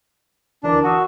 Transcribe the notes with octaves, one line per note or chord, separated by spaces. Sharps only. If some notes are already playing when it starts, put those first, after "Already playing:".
D2 E3 D4 A#4
F#4 D#6 E6